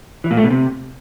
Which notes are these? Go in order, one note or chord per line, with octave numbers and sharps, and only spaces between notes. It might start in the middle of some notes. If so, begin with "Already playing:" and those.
E3
A#2
A3
B2
C3